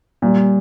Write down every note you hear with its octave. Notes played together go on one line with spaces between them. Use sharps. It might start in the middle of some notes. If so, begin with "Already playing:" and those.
A#2 G3